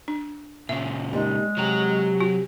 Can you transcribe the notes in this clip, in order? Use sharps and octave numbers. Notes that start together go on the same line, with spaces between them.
D4
A#2 C#3 E5
G3 G#3 A#3 D#4
C3 F#3 G4 G#4 A#5
F#4